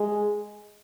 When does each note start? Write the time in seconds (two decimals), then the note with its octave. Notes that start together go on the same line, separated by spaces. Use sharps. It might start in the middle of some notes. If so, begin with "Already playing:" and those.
Already playing: G#3